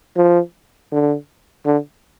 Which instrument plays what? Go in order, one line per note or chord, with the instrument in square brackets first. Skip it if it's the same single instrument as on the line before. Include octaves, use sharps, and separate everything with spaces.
[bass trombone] F3
D3
D3